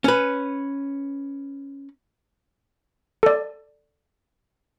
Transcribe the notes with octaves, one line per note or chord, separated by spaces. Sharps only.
C#4 B4
A4 D5